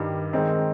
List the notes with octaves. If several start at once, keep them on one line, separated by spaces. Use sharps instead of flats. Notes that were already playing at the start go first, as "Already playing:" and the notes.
Already playing: G2 D#3 G3
D#3 G#3 C4 D#4